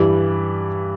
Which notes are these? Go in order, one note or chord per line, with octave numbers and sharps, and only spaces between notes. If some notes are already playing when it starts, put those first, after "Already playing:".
Already playing: G2 E3 G3